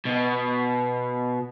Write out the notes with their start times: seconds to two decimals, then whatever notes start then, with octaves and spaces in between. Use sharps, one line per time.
0.05 B2